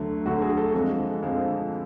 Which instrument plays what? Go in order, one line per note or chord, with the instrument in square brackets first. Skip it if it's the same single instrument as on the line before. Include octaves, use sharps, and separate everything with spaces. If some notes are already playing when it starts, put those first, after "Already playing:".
Already playing: [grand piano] D2 D3 F#3 A3
D2 D3 F#3 A3 F#4
G#4
A4
F2 D3 F3 G#3
F2 D3 F3 G#3